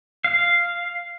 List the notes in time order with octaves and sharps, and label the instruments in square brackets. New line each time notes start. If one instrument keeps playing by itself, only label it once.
[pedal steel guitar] F5